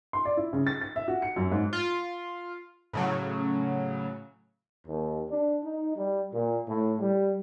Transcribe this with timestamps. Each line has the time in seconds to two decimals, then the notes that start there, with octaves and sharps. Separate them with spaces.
0.13 C6
0.25 D5
0.37 E4
0.53 C#3
0.67 A6
0.81 A6
0.96 E5
1.08 F#4
1.22 C#7
1.36 F#2
1.52 G#2
1.73 F4
2.93 A2 C#3 F#3
4.87 D#2
5.29 D4
5.63 D#4
5.96 G3
6.32 A#2
6.68 A2
7.00 G3